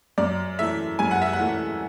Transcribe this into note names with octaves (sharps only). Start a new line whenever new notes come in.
F#2 D5
E3 A3 E5
F#2 G#5
F#5
E5
F#5
E3 A3